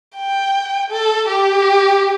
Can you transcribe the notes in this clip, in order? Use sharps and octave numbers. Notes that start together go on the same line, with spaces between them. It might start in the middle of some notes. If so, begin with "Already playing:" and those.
G5
A4
G4